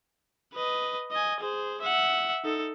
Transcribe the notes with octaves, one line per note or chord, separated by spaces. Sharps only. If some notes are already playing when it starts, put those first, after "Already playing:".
B4 D#5
D#5 G#5
G#4 C5
E5 F#5
D#4 A4